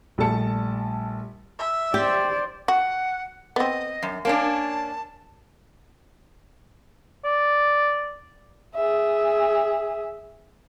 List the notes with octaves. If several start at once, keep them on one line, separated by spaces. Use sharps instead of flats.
A#1 G3 A3 A4 A5 C#7
E5
G4 C5 D5
F#4 F#5
B3 C4 D#5
F#2
A#3 C#4 D4 A5
D5
G#4 E5